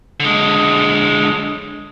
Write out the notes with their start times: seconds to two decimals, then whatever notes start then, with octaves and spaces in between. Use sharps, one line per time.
0.20 D3 G#3